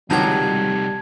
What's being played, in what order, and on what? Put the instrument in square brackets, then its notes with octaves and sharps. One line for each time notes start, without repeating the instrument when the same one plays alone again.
[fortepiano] C#2 D#3 F#3 [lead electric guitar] C3 D#4 [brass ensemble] G3 [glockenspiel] A5 G#6